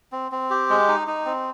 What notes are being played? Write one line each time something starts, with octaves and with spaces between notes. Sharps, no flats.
C4
C4
G4
G#3
D#4
D#4
C4